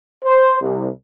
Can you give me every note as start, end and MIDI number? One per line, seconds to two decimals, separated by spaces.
0.24 0.61 72
0.61 0.88 36